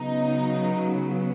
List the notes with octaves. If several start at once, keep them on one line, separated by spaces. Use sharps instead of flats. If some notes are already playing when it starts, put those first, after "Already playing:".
Already playing: C#3 F#3 B3 D#4